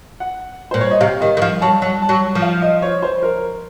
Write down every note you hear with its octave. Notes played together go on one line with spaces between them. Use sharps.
F#5
A#2 C5
C#5
D#5
C3 F5
D#3 D#5
D#3
F3 F5
F#3 A5
F#3
A5
F#3
F3
F5
D#5
C#5
C5
A#4